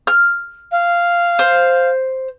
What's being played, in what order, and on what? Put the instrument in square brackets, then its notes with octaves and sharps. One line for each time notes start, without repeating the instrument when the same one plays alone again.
[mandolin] F6
[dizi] F5
[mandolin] C5